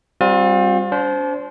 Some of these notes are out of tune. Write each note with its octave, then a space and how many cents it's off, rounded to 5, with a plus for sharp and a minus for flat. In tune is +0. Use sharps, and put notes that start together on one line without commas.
G3 +0 C4 +0 F4 +40
D4 -40 C5 -10